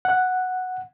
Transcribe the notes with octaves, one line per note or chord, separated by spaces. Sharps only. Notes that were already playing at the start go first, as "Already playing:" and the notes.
F#5